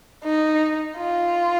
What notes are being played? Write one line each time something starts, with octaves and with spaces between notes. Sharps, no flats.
D#4
F4